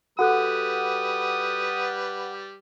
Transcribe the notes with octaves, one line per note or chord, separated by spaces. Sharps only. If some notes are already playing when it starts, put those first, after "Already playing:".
G3 F#4 A4 B4 F#5 D#6 F#6